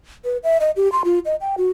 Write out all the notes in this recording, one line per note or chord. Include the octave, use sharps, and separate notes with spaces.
B4
E5
D#5
G4
C6
F4
D#5
G5
F#4